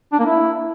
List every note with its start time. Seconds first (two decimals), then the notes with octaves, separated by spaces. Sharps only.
0.12 D4
0.19 A#3
0.26 E4